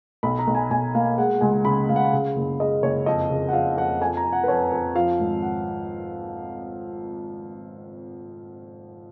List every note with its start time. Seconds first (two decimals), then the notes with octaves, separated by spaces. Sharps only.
0.23 B1 B5
0.39 A#5
0.47 B1
0.55 G#5
0.71 B1 G#5
0.94 A#3 F5
1.18 G#3 F#5
1.41 C#2 G#5
1.65 C#3 B5
1.88 C#2 F5
1.96 F#5
2.05 F5
2.13 C#3
2.36 F#1
2.60 G#3 D#5
2.83 F#1 C#5
3.06 F2 D#5
3.30 C#3
3.49 F#5
3.53 F3 F5
3.77 F2 F#5
4.01 F2 G#5
4.17 A#5
4.25 F2
4.33 F#5
4.43 B4
4.48 F2 C#5
4.72 F2
4.95 F3 F5
5.20 G#1
5.42 F#5